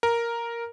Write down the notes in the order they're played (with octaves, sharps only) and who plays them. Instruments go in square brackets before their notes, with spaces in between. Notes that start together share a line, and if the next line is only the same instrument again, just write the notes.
[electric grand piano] A#4